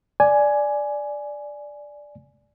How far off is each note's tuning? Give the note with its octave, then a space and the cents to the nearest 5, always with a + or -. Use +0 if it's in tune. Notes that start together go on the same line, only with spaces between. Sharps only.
D5 +0 G#5 +10